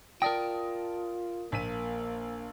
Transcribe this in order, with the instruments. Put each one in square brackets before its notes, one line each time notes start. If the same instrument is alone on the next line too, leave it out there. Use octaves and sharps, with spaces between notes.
[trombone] F4 [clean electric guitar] A#4 D5 G5 [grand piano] A5 D#6 A#6
[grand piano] A#1 B6 D#7 [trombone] A#3